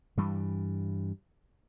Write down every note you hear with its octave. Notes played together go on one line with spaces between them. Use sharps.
G2 E3 G3